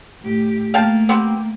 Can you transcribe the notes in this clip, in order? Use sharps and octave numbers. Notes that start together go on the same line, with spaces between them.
A2 G4
A3 A#3 F5 G5 A5
B3 C4 G4